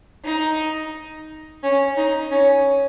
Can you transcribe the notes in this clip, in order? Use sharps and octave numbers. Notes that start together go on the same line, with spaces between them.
D#4
C#4
D#4
C#4